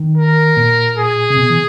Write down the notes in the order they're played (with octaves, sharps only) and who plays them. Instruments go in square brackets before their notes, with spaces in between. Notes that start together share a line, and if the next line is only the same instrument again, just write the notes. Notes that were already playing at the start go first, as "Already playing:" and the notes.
Already playing: [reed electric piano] D#3
[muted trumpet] A#4
[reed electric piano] A#2
[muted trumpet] G#4
[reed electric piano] C3
B2
E3